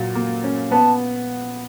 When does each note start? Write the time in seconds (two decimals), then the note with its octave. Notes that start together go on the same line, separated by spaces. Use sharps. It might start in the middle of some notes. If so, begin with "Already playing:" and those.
Already playing: A#2 F#3
0.15 A#3
0.44 C#4
0.71 B3 A5